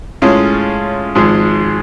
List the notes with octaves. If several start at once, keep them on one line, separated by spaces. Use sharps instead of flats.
A2 G#3 C#4 F4
G#1 G#2 F3 G#3